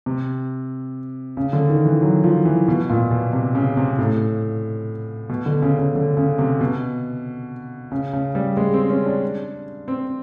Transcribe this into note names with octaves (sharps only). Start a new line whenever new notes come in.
C3
C#3
D3
D#3
E3
F#3
F3
E3
B2
A#2
B2
C3
C#3
C3
A2
B2
D3
C#3
C#3
D3
C#3
C3
B2
C#3
C#3
G3
G#3
C4
C#4
D4
C4